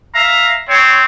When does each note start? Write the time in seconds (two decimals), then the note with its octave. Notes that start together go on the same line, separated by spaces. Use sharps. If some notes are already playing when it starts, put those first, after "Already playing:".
0.14 E5 F5 A#5
0.68 C4 C#5